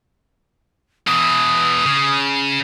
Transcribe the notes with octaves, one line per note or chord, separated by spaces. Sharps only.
B2 E3 D#6
C#3